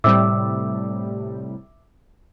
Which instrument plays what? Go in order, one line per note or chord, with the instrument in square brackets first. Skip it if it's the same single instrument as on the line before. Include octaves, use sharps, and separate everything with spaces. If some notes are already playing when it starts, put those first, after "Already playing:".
[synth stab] A2 C3 G3 [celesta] E5 D6 E6